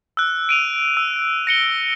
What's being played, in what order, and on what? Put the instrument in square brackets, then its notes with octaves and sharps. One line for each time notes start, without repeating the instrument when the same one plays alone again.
[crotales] E6 F#6
D7 D#7 F7
E6
A#6 C#7 G7